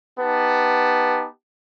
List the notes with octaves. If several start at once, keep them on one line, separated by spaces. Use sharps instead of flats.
B3 D#4 G4 A5